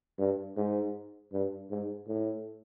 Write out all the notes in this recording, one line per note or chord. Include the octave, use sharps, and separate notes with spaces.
G2
G#2
G2
G#2
A2